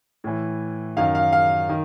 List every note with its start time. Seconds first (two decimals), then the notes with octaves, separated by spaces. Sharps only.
0.24 A2 E3
0.96 F#2 D#3 F5
1.15 F5
1.32 F5
1.69 D#3